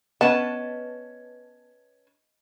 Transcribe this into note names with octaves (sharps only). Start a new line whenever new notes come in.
B3 C#4 B4 D#5 A5